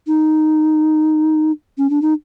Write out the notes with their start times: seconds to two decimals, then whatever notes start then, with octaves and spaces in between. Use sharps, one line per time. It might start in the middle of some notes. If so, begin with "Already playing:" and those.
0.07 D#4
1.78 C#4
1.90 D4
2.02 D#4